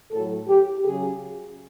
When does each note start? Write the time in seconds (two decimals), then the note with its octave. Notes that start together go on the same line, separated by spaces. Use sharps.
0.12 A2 F#3 A4
0.47 G4
0.84 C#3 F#3 G#4